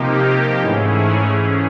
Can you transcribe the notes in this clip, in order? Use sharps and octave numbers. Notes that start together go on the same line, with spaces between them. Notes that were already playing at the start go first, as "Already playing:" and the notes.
Already playing: C3 F3 A#3 D#4 G4
G4
G#2 E3 A3 C#4 E4 G#4